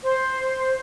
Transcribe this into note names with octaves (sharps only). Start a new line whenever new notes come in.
C5